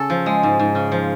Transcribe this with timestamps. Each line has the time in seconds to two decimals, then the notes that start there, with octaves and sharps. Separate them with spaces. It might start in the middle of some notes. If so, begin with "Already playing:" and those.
Already playing: C#3 C#4 A4
0.10 F3
0.26 G#3
0.43 G#2
0.59 G#2
0.75 C#3
0.92 F3